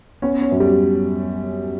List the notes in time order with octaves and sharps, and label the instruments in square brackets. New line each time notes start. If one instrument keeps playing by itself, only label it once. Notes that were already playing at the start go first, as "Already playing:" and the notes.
[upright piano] B3 [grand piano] C#4
[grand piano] C#4
[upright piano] F#2
[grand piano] G3